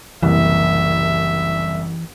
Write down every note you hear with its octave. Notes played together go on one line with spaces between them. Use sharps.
F#1 C2 E3 E5